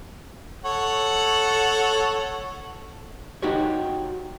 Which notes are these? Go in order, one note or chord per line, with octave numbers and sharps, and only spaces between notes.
A4 C#5 F#5
D#4 F#4 G4 C#5